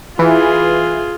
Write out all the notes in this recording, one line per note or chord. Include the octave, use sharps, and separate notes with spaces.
E3 F4 G#4